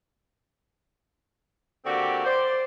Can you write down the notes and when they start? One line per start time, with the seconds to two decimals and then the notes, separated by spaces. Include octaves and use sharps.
1.85 D3 A#3 C4 F#4 G4
2.25 C5 D5